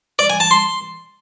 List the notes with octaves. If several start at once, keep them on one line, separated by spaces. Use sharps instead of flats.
D5
G#5
A5
C6